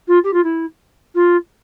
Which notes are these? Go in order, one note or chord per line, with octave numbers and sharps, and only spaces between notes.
F4
G4
F4
E4
F4